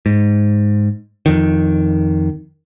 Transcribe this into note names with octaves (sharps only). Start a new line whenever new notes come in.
G#2
F2 D#3